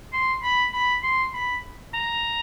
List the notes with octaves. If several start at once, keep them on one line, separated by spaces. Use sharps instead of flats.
C6
B5
B5
C6
B5
A#5